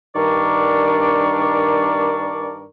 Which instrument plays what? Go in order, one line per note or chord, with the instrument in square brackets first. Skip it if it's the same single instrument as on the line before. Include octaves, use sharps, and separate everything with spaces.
[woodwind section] G2 D#3 D4 A#4 D5 C#6